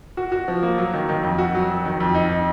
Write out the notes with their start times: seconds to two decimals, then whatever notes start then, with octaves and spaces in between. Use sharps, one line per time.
0.17 F#4
0.32 F#4
0.48 F3
0.63 A#3
0.78 F#3
0.93 D#3
1.09 D#3
1.23 F2
1.38 F#4
1.55 F#3
1.69 F#3
1.85 D#3
2.00 F2
2.14 D#4
2.30 D#4